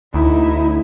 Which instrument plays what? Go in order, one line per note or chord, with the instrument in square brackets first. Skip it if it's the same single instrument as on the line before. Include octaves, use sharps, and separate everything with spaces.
[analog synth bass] D2 [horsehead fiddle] D#4 E4